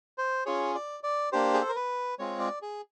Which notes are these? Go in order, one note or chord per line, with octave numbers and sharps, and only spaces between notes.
C5
C#4 F4 G#4 C#5
D5
D5
A#3 D4 G4 C5
G#4
A4
A#4
B4
G#3 C4 F4 G#4 C#5
D5
G#4